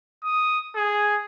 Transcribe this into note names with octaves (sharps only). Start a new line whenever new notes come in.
D#6
G#4